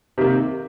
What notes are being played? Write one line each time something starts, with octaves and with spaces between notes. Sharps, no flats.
C3 D#3 A#3